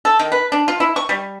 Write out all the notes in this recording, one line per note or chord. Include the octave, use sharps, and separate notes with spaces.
A4
D#3
B4
D4
F4
E4
C#6
G3